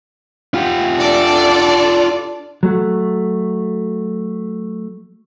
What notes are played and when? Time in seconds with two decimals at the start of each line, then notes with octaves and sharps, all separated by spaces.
0.54 F4 G4
0.99 D4 A4 D5
2.63 F#3 A3